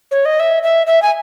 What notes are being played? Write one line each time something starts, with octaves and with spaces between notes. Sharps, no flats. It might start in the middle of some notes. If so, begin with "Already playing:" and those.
C#5
D#5
E5
E5
E5
G#5